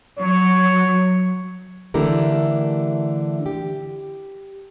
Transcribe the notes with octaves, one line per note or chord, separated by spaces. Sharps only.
F#3 C#5
D3 E3 A3 E4 G4 A#4
G4